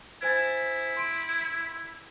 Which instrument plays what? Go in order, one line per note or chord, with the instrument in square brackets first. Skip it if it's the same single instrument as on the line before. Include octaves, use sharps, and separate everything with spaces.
[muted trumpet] E4 [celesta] C5 G#5 A6
[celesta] C6 D7